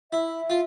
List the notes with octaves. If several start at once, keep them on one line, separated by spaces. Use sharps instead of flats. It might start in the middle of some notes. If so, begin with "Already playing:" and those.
E4 E5
F4